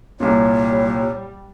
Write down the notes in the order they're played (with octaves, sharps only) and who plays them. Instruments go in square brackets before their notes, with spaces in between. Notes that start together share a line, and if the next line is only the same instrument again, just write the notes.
[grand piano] C2 A#2 [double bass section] G3 [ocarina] C#5